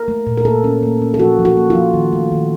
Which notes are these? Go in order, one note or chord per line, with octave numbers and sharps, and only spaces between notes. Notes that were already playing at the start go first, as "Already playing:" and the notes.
Already playing: A#4
A3
A#2
A#4
A#3 A4
C#4
A#3
C#4
A4
F3 F#4
F3
F#4
A#3
F4
F3
D#3
A3
D#3